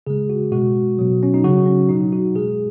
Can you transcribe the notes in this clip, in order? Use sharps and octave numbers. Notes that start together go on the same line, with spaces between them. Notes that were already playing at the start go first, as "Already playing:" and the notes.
C#3 G#3 G#4
F#4
B2 G#3 F#4
B2 F#3
C#4
D#4
C#3 F#3 F#4
C#4
B2 F#3 D#4
F#4
B2 G#3 G#4